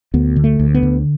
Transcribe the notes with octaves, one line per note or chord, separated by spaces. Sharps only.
D2 B3
D3
A3
D2
B3
D3